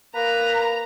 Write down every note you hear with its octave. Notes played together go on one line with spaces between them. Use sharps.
A#3 B4 A#5